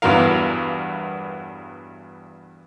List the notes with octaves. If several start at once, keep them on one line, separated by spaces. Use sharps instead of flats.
E2 G2 E3 F#3 A#4 F5